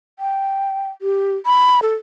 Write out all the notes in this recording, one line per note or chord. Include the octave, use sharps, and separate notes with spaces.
G5
G4
B5
A4